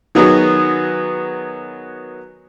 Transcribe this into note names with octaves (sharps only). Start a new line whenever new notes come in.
D#3 F#3 B3 D#4 F#4 G#4